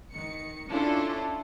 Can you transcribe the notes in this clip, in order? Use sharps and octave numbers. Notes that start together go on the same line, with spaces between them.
D#3 C#7
C#4 D4 E4 F4 A4